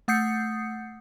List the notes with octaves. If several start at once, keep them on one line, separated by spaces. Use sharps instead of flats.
A3 F#5 D#6 G6 C7 C#7